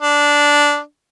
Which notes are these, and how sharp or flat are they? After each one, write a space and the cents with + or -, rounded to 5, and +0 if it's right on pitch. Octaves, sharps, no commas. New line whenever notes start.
D4 -10